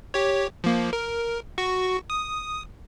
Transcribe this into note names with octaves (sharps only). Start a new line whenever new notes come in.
G4 C#5
F3 A#3
A#4
F#4 C#6
D#6